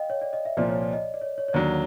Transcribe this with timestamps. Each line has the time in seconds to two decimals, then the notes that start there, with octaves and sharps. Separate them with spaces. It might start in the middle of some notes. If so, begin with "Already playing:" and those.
Already playing: D#5 F5 G5
0.10 C#5
0.21 D5
0.33 D#5
0.45 E5
0.57 C2 A#2 F3 D5
0.69 C#5
0.81 D5
0.93 D#5
1.14 D5
1.22 C#5
1.38 C#5
1.48 C#5
1.53 D#2 D3 F#3 D5